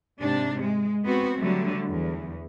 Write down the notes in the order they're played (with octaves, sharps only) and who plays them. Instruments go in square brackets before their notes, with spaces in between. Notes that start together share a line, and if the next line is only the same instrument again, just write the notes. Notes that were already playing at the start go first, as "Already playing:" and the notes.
[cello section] G#2 C3 D4
G#3
B3 C4 F#4
D3 F#3 G3 A3
E2